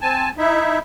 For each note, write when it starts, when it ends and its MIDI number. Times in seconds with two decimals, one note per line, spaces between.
0.01 0.30 60
0.01 0.30 80
0.01 0.30 81
0.38 0.79 63
0.38 0.79 64
0.38 0.79 76